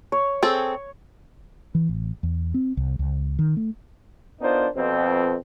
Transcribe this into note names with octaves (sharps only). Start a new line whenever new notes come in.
C#5
C4 G#4 A4
E3
A1
E2
C4
C2
C#2
D#3
A3
B3 D4 D#4 F4 A#4 C5
F2 B2 C4